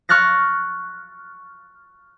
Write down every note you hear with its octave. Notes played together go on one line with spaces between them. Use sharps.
C#6 F6 F#6 A6 A#6